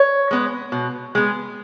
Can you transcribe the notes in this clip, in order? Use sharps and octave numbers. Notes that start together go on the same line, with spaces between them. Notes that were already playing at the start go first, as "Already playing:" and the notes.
Already playing: C#5
G#3 B3
B2
G#3 B3